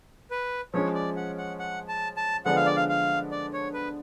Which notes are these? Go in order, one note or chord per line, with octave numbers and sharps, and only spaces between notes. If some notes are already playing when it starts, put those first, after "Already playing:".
B4
F3 G#3 C#4 C#5
D5
F#5
F#5
F#5
A5
A5
D3 F3 G#3 B3 D4 F#5
F5
D5
F5
F5
D5
C#5
B4